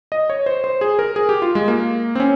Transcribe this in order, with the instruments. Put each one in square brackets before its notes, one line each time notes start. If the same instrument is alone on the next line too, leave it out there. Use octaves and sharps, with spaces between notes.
[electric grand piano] D#5
C#5
C5
C5
G#4
A#4
G#4
G4
F4
G#3
A#3
C4
C#4